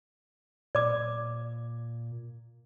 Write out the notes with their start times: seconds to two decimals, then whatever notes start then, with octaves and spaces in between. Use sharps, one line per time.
0.75 A#2 D5 D6